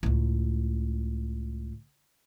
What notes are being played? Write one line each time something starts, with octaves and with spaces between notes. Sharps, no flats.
C#2 A2